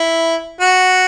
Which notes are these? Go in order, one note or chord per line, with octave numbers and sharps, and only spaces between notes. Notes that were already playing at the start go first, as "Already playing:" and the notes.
Already playing: E4
F#4